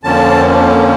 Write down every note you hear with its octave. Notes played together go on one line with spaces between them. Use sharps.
F2 D3 F3 A#3 C#4 A5